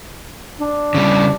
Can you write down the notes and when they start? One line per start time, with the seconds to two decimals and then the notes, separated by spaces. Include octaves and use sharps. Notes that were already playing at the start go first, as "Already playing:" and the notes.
0.60 D4
0.95 C#3 G3